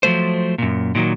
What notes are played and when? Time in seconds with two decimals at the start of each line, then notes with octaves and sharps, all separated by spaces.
0.03 F3 F#3 A3 C5
0.58 F#2 A#2
0.95 A#2 D#3 F#3